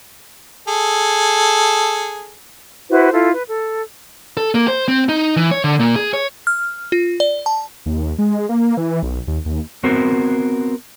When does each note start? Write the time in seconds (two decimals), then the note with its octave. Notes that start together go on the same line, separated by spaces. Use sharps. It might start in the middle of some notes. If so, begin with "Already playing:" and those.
0.68 G#4 A4
2.89 E4 F#4 B4 C5
3.12 E4 F4 A4
3.31 B4
3.48 A4
4.37 A4
4.55 A#3
4.68 C5
4.88 C4
5.09 D#4
5.37 E3
5.51 C#5
5.64 D3
5.80 A#2
5.96 G#4
6.13 C#5
6.47 F6
6.92 F4
7.20 D5
7.46 A5
7.86 D#2
8.19 G#3
8.49 A#3
8.77 E3
9.03 B1
9.27 D#2
9.46 D#2
9.83 B3 C4 F#4 A#4 C5